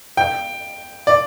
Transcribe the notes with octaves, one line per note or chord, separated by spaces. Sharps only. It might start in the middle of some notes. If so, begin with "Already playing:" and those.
G5
D5